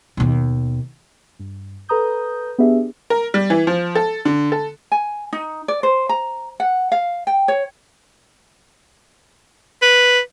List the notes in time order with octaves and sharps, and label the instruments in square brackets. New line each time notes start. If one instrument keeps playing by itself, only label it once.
[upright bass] D#2 B2
[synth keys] G2
A4 B4 A#5 D#6 G6
B3 D4 G4 G#4 E5
[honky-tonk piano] A#4
G3
E3
F3
A4
D3
A4
[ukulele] G#5
D#4
D5
C5
A#5
F#5
F5
G5
C#5
[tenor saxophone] B4